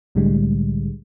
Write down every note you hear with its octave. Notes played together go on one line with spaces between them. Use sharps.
C2 A2 D3 G3 G#3